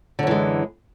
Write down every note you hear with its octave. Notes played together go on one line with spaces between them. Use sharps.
F#2 D3 E3 G#3